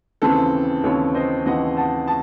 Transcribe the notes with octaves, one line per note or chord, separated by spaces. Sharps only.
D#2 C#3 E3 C4 A4
D#2 C#3 E3 C4 A4 C#5
C5 D#5
D#2 C#3 E3 C4 D#5 F#5
F#5 A5
A5